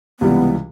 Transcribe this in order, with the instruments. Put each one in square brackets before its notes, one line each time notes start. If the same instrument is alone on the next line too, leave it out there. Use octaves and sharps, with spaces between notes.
[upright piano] C#2 C3 E3 G3 [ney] B3